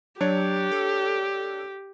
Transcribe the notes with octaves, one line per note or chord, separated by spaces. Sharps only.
F#3 D4 G4 C#5
A4